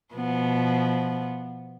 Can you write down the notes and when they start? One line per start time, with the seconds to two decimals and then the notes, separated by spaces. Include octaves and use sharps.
0.15 B2 F3 B3